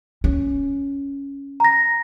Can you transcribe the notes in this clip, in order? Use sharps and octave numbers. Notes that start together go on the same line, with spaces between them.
C#4
A#5 A#6